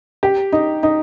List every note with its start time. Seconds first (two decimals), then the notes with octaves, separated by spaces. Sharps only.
0.23 G4
0.52 D#4
0.83 D#4